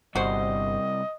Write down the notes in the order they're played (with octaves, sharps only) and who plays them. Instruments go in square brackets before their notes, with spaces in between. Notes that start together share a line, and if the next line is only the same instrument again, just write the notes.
[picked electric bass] G1 [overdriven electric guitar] C2 [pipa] F#4 C5 [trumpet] D#5